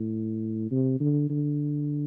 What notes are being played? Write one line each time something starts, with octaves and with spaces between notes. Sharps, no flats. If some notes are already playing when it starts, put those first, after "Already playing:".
Already playing: A2
C3
D3
D3